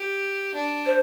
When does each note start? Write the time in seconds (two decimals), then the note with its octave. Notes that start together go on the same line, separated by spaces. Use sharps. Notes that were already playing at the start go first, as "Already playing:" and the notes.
Already playing: G4
0.54 D4
0.86 C5